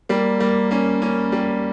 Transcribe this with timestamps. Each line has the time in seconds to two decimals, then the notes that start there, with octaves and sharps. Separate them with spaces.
0.09 G3 A#3
0.40 G3 A#3
0.71 A#3 C#4
1.02 A#3 C#4
1.32 G3 A#3